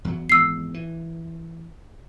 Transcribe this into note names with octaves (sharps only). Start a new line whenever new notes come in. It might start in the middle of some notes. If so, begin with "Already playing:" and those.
E2 F#3
G#1 E2 E6 C7
E3